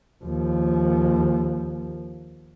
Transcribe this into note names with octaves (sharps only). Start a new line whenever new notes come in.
D#2 F3